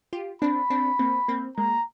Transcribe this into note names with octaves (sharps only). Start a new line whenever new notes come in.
F4 G4
C4 D4 B5
C4 D4
A#3 C4
A#3 C4
G#3 A#3 A#5